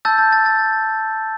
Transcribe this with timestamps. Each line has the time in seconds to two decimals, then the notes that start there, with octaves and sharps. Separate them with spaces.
0.05 A5 E6 G6 A6
0.18 G6
0.33 A6
0.46 A6